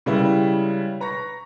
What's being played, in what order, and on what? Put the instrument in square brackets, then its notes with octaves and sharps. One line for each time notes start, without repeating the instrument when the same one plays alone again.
[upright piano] C#3 G3 G#3 E4 B4
B4 A#5 C#6 A#6